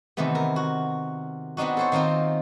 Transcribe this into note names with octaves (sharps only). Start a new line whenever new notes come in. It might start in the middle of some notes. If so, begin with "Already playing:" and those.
C3 D#3 E3 A3 B3
A#4
F#4
B3 C4 D4 D#4 F#4
A4 C5 C#5
D#3 A#3 C4 D#4 F4